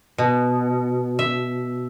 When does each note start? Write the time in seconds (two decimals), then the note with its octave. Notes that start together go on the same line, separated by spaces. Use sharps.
0.18 B2
1.19 E5